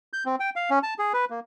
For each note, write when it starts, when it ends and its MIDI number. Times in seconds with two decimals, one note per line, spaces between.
0.13 0.24 91
0.26 0.36 60
0.40 0.50 79
0.56 0.70 77
0.70 0.79 61
0.83 0.94 81
0.99 1.13 68
1.13 1.25 71
1.30 1.40 58